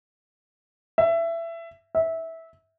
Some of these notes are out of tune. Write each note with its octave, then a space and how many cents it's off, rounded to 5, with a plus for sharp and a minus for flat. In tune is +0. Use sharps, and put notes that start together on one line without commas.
E5 +20
E5 -15